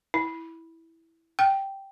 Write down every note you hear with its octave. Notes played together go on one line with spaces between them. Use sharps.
E4
G5